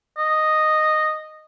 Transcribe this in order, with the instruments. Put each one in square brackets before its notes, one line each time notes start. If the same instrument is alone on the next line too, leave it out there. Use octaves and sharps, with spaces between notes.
[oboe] D#5